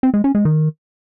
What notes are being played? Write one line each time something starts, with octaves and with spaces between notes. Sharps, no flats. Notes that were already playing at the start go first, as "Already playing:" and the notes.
C4
G#3
C#4
G#3
D#3